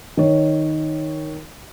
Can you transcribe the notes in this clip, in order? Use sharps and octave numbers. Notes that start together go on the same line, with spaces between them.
D#3 C#5